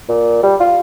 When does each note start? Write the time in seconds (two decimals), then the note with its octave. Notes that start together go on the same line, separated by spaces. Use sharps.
0.09 A#2
0.43 G3
0.60 F4